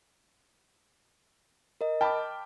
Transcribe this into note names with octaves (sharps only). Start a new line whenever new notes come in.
A#4 D#5
G5 A5 B5 D6 F6